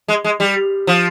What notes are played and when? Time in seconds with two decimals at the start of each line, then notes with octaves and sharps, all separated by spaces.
0.08 G#3
0.24 G#3
0.40 G3
0.87 F3